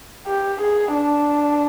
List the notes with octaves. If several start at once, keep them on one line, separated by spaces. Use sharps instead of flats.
G4
G#4
D4